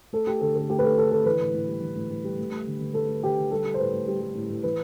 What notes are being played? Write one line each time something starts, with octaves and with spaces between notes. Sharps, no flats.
A3 A4
A3 G4
D3 A4
D3 A4
A3 G4
B4
A3 A4
D3 A4
D3 A4
E3 B4
A2
A2
G3
E3
A2
A2
G3
A3
A3
D3
D3
A3 A4
A3
D3 G4
D3
G3 A4
G3
C5
A2 B4
A2
G3
G3
A2
A2
E3 B4